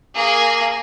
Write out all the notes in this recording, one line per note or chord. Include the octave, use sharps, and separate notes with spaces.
A#3 G#4